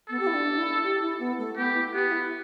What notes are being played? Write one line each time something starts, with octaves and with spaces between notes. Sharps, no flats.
B3 A4
G4
E4
D4
D4
E4
G4
E4
B3
A3
B3 G4
E4
B3 G4
G4
E4